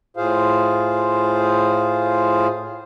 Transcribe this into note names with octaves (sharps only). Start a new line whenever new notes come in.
A2 F4 G#4 C5 F5